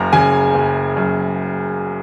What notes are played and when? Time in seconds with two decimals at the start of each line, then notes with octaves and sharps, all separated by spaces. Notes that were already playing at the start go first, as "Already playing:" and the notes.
Already playing: F#1 F#2 A#5
0.13 C#3 G#5
0.54 F#1
0.97 F#2